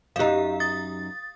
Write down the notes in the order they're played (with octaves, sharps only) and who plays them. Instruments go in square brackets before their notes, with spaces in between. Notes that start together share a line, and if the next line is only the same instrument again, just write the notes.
[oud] F#2 D#4 [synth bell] G4 F5
[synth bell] D#6 A6